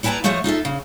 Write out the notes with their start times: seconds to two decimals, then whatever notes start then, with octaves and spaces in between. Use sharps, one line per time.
0.03 G3 E4 B4 G5 A5 A#5
0.24 F3 A3 F#4 C5 C#5 D#5
0.44 D#4 F4 A4 E5
0.65 C#3